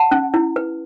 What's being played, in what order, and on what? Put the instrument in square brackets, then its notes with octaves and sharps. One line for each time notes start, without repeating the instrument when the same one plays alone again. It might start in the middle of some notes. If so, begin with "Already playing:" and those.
Already playing: [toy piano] F#5 A5
C#4
E4
B4